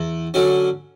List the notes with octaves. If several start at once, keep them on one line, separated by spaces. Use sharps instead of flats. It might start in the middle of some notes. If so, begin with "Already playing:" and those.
Already playing: E2
D3 F#3 C#4